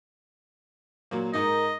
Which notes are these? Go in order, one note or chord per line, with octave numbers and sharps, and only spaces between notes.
A#2 F#3 A#3
G#2 D#4 A#4 D#5 A#5